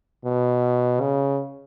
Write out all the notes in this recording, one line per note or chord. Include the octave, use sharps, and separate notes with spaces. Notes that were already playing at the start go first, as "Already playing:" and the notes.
B2
C#3